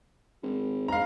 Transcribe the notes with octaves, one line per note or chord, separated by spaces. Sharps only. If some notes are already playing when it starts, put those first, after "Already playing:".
G#1
G#2 F5 A#5